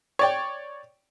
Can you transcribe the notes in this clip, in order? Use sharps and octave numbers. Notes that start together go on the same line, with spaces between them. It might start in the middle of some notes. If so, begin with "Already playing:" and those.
C#5 D5 G5